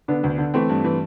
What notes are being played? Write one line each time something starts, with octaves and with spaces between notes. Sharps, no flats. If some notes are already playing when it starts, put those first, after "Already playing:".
D3 B3 D4
D2
D3
E3 A3 C4
G2
E3